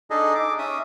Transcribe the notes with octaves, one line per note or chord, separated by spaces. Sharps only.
D4 D#4 G#4 A4 D#5
D6
C#4 E5 D#6